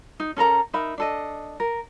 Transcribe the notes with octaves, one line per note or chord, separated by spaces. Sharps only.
D#4
C#4 A4 A#4 A#5
D#4 A#4 E5 B5
D4 A4 D#5
A#4